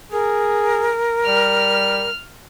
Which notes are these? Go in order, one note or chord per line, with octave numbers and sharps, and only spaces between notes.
G#4 A#4
G3 F6